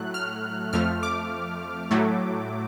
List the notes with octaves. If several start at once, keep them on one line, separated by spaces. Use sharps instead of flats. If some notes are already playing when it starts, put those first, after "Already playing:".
Already playing: A2 F#3 A3 F#6
F6
F2 F3 A3 F6
D6
A2 F#3 A3